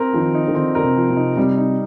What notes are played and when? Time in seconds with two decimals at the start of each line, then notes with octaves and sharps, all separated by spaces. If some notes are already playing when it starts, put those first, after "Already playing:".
Already playing: C4 A#4
0.13 D#3 F3
0.34 D#4
0.48 D#3
0.54 D3 C4
0.75 D3 A#4
0.82 C3
0.96 F3
1.10 C3
1.16 D#4
1.36 C3 G3
1.57 D#4